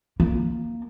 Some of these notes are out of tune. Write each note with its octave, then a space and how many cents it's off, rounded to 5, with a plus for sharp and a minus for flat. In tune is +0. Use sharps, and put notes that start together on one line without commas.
A#3 +0